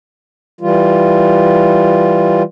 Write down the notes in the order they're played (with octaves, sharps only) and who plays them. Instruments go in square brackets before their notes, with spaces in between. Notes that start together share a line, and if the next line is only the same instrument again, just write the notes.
[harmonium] E3 G3 F4